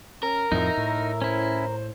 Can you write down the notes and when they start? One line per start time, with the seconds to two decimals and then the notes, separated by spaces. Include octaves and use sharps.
0.23 C#4 A#4
0.52 F2 A2 F3 D#4 E5
0.78 A2
1.22 C#4 E4 C5